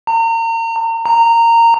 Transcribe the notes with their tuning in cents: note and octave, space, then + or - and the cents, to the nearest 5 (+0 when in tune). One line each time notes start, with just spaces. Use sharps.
A#5 -35
A#5 -15